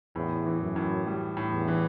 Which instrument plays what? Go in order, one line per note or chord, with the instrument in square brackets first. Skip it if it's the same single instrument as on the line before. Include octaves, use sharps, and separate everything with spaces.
[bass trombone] E2 [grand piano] A2
[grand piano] E3
[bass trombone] F#2
[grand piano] A2
G3
A2
[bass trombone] E2
[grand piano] E3